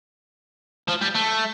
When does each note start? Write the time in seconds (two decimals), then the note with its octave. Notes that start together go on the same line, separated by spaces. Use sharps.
0.88 F3
1.01 G3
1.15 A3